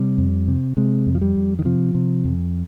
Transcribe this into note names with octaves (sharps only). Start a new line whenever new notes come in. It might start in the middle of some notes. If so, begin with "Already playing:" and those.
Already playing: C3 G3
F2
C3
C3 G#3
F2
F3
G3
F2
D#3
C3 F3
C3
F2